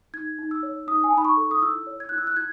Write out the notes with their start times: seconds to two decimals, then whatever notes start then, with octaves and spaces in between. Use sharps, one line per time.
0.14 D#4 G#6
0.39 D#4
0.51 E6
0.63 C#5
0.87 D#4 D#6
1.04 G#5
1.11 A5
1.13 D#4 B5
1.25 C#6
1.37 A4
1.51 D#6
1.62 E4 E6
1.87 C#5
2.00 G#6
2.09 E4 F#6
2.18 E6
2.27 F#6
2.36 E4 G#6